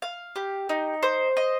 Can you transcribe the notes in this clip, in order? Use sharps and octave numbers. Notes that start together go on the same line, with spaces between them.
F5
G4
D#4
C5
D#5